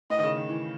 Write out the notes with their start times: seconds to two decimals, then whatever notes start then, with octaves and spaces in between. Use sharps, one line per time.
0.10 A2 D#5
0.19 D#3
0.24 C#3
0.37 D#3
0.49 E3